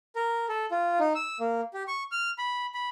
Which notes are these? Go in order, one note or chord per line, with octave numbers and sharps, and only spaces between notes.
A#4
A4
F4
D#4
E6
A#3
G4
C#6
F6
B5
B5